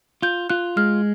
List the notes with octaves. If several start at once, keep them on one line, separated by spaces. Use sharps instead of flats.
F4 G6
F4 F#6
G#3 F6